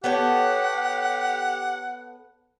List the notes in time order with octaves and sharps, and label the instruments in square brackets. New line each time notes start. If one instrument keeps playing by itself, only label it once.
[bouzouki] B3 A4 C#5 [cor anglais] G4 [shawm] F#5